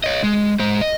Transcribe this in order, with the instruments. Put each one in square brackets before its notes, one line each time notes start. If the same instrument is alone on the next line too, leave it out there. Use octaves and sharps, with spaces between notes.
[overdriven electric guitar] C#5 D#5
G#3
G#3 C5
D#5